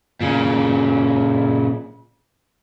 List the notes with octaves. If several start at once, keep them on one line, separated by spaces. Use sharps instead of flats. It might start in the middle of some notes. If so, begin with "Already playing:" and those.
A#2 C#3